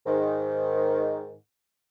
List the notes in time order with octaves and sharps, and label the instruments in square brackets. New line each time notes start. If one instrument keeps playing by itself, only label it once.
[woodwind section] G#2 D#3